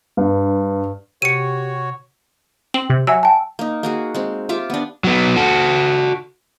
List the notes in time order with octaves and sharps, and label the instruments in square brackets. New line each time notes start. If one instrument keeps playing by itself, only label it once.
[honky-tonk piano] G2
[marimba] C3 [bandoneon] F#4 C#5 [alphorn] G4 [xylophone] C#7 D#7
[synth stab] C4 [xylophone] F#7
[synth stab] C3
[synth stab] F#3 [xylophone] E5 G#5 E6
[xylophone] G5 A5
[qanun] A#3 D#4
A#3 F#4 G#4
G#3 C4
F4 G4 E5 D6
B3 D4
[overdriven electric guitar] F#3 B3
F#4 A4